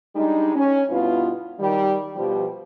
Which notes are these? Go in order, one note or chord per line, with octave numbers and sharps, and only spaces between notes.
G3 G#3 D4 D#4
C#4
G2 B2 B3 E4 F4
D#3 G3
B2 F3 G3